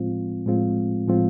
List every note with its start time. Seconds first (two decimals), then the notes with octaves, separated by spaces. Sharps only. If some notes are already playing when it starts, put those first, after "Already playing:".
Already playing: A2 F3 G#3 C4 F4
0.46 A2 F3 G#3 C4 F4
1.08 A2 F3 G#3 C4 F4